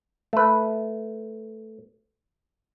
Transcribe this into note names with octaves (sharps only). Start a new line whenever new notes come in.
A3 B4